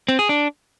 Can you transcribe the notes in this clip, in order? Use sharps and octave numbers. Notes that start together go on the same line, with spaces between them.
C4
G#4
D4